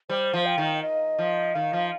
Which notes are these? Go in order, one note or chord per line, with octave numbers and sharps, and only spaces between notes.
G3 C5
F3
G5
D#3
D#5
F3
D#3 F5
F3